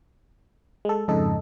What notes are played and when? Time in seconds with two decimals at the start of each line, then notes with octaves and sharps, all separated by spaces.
0.85 G#3 A4
1.08 F2 G#2 C#3 D#4 A4 D#5